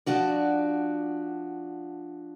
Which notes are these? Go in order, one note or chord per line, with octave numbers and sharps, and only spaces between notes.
F3 D4 F#4 D5